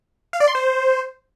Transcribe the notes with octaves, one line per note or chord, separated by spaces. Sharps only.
F5
D5
C6
C5